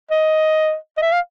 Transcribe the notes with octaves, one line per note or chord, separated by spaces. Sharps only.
D#5
D#5
E5
F5